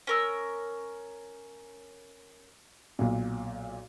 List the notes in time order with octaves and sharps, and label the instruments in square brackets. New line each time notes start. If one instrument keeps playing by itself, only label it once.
[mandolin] C#4 A#4 E6
[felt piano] B1 A#2